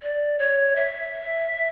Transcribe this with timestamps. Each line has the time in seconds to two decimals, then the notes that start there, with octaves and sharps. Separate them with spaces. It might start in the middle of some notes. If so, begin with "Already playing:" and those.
0.02 D5
0.39 C#5
0.76 E5